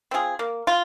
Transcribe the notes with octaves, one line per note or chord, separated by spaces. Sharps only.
C4 F4 G#4
A#3
F4